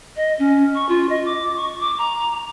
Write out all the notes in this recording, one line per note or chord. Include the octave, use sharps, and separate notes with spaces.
D#5
C#4
C#6
F4
D#5
D6
C#6
D6
A#5